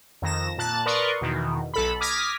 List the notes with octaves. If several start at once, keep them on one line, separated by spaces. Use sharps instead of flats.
F2 D#3 A#6 E7
A#2 A5 F#6 A6
A#4 B4 D5 C6 C#6 D#6
E2 B2 D#3
B1 A4 B5
D6 D#6 F6 G#6 A#6 B6